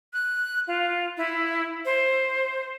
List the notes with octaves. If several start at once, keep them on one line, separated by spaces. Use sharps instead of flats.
F#6
F4
E4
C5